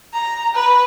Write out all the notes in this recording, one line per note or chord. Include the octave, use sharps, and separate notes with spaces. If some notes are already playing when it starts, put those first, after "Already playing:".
A#5
B4